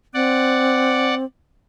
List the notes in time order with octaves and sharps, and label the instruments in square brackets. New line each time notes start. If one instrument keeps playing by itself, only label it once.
[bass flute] C4 [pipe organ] D5 F#5